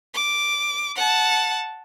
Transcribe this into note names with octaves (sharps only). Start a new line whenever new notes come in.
D6
F#5 A5